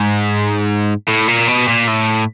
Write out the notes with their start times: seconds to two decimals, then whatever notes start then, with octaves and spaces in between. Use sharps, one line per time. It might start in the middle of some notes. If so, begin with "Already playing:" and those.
Already playing: G#2
1.09 A2
1.28 A#2
1.48 B2
1.68 A#2
1.87 A2